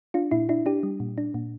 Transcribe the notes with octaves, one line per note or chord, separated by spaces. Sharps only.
D4 F4
A#2 E4
D4 E4
D4 G4
G3
A#2
D4
A#2